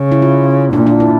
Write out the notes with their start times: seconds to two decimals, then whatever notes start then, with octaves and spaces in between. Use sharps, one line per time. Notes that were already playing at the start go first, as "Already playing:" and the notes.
Already playing: C#3
0.12 E4
0.22 F4
0.73 A#2 D4
0.87 D4
1.00 E4